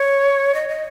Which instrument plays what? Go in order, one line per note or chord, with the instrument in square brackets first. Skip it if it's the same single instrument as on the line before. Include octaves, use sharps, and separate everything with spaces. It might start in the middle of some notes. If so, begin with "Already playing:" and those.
Already playing: [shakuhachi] C#5
D#5
D#5